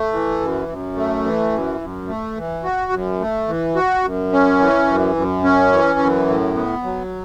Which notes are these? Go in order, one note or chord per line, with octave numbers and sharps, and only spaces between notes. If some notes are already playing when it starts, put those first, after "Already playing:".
Already playing: A3
E3
F#2
F#2
A3
E3
F#2
F#2
A3
E3
F#4
F#2
A3
E3
F#4
F#2
C#4
E3
F#2
F#2
C#4
E3
F#2
A2
B3
F#3